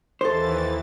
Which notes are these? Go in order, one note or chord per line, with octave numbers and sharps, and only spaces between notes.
D#2 E3 A4 C5 A6